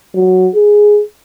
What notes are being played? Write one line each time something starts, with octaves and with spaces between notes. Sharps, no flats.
F#3
G#4